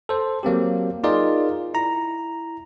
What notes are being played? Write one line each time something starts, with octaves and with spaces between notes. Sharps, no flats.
A4 C5
F#3 A#3 C4 G4
D#4 F4 G#4 A#4 D5
E4 A#5